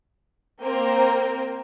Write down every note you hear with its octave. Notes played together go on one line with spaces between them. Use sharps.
A#3 C4 A#4 C5 G5 A#5